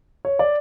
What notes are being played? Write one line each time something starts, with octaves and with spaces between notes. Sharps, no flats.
C#5
D5